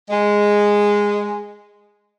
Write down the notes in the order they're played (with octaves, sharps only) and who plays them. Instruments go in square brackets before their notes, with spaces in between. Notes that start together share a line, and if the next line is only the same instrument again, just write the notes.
[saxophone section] G#3